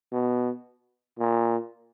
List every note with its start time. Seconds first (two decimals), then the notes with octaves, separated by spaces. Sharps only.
0.12 B2
1.19 A#2